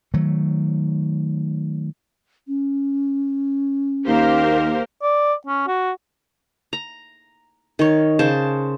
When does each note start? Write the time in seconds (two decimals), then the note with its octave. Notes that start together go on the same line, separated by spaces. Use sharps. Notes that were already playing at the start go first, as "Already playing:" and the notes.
0.14 D#3 F#3 A3
2.48 C#4
4.07 D#2 A#3 G4 A#4 C5
5.03 D5
5.47 C#4
5.68 F#4
6.73 A#5
7.79 D#3 C#5
8.19 C#3 C5 A5